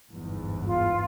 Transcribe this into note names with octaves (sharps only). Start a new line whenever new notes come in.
G1 E2 G#2
F4